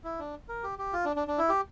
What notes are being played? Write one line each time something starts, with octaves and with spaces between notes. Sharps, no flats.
E4
D4
A#4
G4
G4
F4
D4
D4
D4
E4
G4